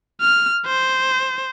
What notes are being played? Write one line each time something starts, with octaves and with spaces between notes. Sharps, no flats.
F6
C5